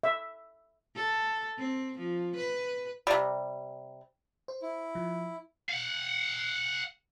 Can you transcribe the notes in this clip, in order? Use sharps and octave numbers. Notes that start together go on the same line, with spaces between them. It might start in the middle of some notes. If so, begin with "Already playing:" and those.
E5
A4
C4
F3
B4
C3 G3
C5
E4
F3
F5 F#5